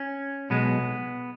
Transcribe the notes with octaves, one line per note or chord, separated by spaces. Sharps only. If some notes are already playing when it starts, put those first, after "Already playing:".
Already playing: C#4
B1 B2 G#3 B3